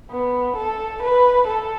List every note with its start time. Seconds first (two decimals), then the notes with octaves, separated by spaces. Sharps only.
0.10 B3
0.56 A4
1.02 B4
1.47 A4